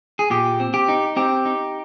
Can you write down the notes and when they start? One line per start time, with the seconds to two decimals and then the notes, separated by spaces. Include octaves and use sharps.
0.19 G#4
0.30 A#2 G4
0.60 C4
0.74 G4
0.88 D#4
1.16 C4 G4
1.45 D#4